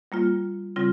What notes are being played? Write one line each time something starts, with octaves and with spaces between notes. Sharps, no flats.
G3 A#3 F4
C#3 G3 C4 F4